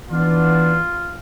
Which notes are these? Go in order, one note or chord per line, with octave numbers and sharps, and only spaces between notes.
E3 B3 D4 F4